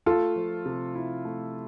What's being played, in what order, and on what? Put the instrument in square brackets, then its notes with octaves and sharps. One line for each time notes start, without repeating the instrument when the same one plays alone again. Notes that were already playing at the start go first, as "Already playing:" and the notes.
[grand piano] A3 [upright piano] F4 A4
[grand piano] F3
C3
E4
A3